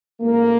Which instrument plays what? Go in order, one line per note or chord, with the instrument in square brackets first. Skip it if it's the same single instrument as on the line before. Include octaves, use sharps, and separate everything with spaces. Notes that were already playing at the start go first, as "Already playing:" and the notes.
[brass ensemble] A1 G#2 E3 A3 A#3